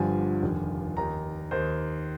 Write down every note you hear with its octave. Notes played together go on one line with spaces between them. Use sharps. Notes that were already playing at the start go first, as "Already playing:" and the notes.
Already playing: G1 G2 D3 F3 G#5
F1 D#2 D3 F3
D#2 D#3 A#5
D#2 D#3 C5